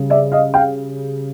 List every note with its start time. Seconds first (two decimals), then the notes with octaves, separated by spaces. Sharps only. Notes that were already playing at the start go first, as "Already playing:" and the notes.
Already playing: C#3 G3 C#4
0.10 D5 E5
0.32 D#5 F5
0.54 F5 G5